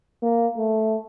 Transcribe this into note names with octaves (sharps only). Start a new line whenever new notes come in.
A#3
A3